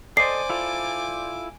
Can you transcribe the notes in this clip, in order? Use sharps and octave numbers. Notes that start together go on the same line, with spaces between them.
A4 C5 D5 D#5 G#5 D6 C7
E4 F4 A4